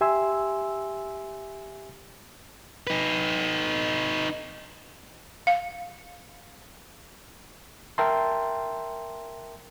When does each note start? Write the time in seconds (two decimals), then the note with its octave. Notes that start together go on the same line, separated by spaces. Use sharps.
0.01 G4 E5 G#5 C6 E6
2.87 D#4 B4
5.47 F5
7.98 A#4 E5 G5 A5 C6